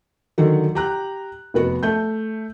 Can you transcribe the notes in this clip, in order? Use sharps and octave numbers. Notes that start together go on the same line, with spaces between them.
D3 D#3 F#3
G4 A#5 F#6
F1 B3 F#4
A3 G6